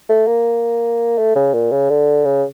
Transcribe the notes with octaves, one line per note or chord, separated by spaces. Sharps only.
A3
A#3
A3
C#3
A#2
C#3
D3
C#3